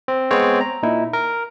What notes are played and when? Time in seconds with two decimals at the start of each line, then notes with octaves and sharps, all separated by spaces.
0.08 C4
0.31 G#3 B3 C4 C#5
0.61 A#5
0.83 A#2 D#4 E4
1.13 A#4